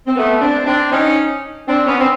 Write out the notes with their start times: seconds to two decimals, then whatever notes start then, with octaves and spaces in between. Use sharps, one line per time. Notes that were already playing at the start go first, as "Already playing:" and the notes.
0.06 C4
0.16 A3 B3
0.41 C4 D4
0.66 C4 D4
0.91 C#4 D#4
1.67 C4 D4
1.86 B3 C#4
1.99 C4